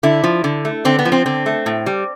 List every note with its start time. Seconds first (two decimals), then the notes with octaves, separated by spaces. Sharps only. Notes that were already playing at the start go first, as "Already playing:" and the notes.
0.03 D3 E4
0.24 F3
0.44 D3
0.65 A3
0.85 D3 C4
0.99 B3
1.05 F3
1.12 C4
1.26 D3 C4
1.46 A3
1.66 A2
1.86 G3